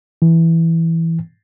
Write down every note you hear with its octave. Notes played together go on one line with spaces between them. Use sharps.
E3